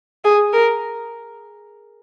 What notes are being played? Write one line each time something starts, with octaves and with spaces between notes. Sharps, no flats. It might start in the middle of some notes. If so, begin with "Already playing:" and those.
G#4
A#4